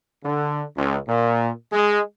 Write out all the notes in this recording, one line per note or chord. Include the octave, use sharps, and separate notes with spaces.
D3
C#2
A#2
G#3